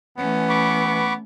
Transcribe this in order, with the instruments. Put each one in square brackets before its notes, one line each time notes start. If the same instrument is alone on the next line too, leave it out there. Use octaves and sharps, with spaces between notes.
[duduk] E3 [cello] A3 C#4 [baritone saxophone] B3
[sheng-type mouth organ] B5 C#6 D6
[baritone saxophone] B3